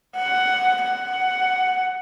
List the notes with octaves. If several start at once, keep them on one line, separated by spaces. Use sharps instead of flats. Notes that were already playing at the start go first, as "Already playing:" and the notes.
F#5
F#5